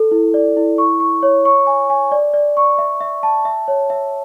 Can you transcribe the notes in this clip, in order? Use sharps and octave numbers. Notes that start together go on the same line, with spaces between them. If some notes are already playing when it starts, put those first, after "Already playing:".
Already playing: A4
E4
D5
E4
C#6
C#6
C#5
C#6
G#5
G#5
D5
D5
C#6
E5
E5
A5
E5
C#5
E5